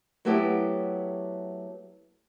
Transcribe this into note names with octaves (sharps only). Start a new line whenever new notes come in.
F#3 A3 B3 E4 G4